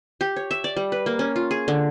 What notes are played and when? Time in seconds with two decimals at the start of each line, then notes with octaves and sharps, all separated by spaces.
0.21 G4
0.36 C#5
0.51 E5
0.64 D5
0.76 G3
0.92 B4
1.06 A#3
1.19 C#4
1.36 F4
1.51 G#4
1.68 D3